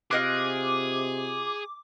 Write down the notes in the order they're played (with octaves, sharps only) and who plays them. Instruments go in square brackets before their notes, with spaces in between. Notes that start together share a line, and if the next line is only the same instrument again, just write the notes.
[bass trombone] C3 [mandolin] F4 D#5 F#6 [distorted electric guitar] G#4 [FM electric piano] D6